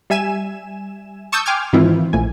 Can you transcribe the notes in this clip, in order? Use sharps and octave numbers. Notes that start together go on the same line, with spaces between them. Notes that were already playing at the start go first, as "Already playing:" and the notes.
G3 E5 G#5 E7
A5 C#6 D#6 E6 G6
G5 G#5 C6 D6 F6 G#6
G#2 D#3 E3 C4 E4 F4
A#1 A2 G#5